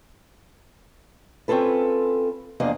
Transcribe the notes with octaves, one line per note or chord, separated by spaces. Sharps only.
C4 C#4 F4 A4 B4
E2 F3 A#3 D4 D#5 F5